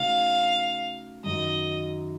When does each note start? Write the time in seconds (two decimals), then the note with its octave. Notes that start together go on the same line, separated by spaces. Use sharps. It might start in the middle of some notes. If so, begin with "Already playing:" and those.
Already playing: C#3 A3 D#4 F#4 F5
1.24 F#2 D#3 F#3 D#5